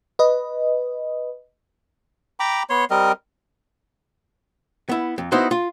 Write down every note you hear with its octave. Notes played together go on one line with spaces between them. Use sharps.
B4 D#5
G5 A#5 B5 D6
B3 C#5 C6
G3 C4 A#4 D#5
B3 E4
F2
B3 D#4 E4 F#4 C5
F4